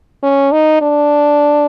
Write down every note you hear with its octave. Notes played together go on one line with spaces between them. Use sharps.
C#4
D#4
D4